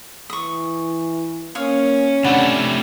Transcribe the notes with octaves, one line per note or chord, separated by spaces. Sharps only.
E3 C#6 D#6
A#3 C#4 C#5 F5 D#6
C3 A3 D4 B4 D5 F#5